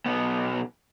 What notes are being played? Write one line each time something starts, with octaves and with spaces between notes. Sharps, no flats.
B1 B3